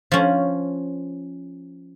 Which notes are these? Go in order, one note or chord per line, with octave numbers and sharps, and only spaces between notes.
F3 C#4